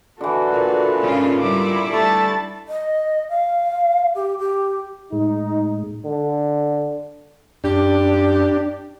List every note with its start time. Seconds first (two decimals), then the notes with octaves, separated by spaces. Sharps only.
0.21 D3 E3 F#4 A4
0.53 A#2
1.01 G#2 C#3 C#4 F4
1.40 G3 E4 D6
1.92 A3 A5 A6
2.68 D#5
3.29 F5
4.15 G4
4.39 G4
5.12 A2 G#3 D#4
6.05 D3
7.64 F#2 D4 G4